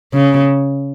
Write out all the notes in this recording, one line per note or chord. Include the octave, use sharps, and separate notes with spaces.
C#3